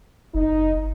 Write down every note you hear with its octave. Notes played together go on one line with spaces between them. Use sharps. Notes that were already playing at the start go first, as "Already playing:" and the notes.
F#1 D#4